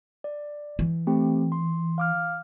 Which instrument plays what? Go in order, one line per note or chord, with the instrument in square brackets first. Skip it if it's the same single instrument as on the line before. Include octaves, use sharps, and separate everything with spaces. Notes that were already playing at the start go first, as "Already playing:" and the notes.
[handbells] D5
[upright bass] E3
[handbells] A3 C4 G4
C6
F5 D6 F6